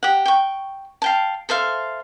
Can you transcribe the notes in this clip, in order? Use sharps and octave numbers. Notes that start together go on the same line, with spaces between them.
G4 F#5
G5 C#6
F5 G5 A5
A4 C5 E5 F5